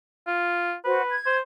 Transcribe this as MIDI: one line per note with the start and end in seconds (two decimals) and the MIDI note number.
0.27 0.74 65
0.85 1.01 66
0.85 1.15 71
0.85 1.01 72
1.10 1.35 92
1.26 1.40 72